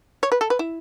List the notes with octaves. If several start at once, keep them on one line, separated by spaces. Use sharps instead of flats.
C#5
B4
A4
B4
E4